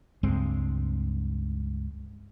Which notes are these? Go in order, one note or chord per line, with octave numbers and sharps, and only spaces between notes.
C#2 G2 G#3 C4